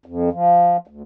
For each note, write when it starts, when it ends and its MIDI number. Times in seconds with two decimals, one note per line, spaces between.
0.06 0.29 41
0.32 0.77 53
0.87 1.02 38